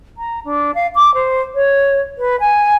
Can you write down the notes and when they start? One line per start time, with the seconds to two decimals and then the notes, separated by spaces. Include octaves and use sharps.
0.18 A#5
0.45 D4
0.75 F5
0.95 D6
1.14 C5
1.55 C#5
2.18 B4
2.40 G#5